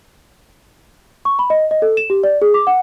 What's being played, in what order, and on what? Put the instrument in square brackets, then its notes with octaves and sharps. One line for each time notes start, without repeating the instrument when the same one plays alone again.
[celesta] C#6
B5
D#5
D#5
A4
E7
G4
D5
G#4
D6
F#5